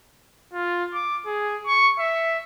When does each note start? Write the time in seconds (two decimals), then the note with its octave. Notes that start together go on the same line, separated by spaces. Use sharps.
0.53 F4
0.94 D6
1.26 G#4
1.66 C#6
1.99 E5